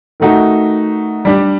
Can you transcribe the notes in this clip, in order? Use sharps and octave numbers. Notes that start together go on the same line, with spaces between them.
D#3 A3 D#4 F#4
G3 D4 G4